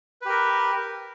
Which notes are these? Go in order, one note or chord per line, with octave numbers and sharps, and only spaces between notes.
G4 A#4 B4